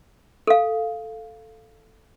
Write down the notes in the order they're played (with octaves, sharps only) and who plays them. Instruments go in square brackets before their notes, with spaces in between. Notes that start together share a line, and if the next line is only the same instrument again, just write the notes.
[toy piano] A4 F5